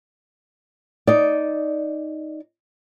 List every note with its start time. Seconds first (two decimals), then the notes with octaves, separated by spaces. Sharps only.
1.07 D#4 D5